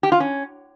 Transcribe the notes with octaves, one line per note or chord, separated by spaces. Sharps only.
G4
F4
C#4